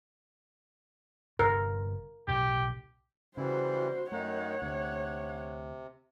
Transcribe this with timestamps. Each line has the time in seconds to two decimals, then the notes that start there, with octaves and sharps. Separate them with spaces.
1.39 G1 C3 A#4
2.28 B1 A2 C3 G4
3.37 C#3 E3 G3 E4 F#4 C5
4.12 F#2 D#3 A3 D#4 C#5 F#5
4.62 D2 C3